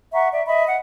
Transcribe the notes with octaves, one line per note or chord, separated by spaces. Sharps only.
E5 F#5 A#5 C#6
D5 E5
D#5 E5 B5
F#5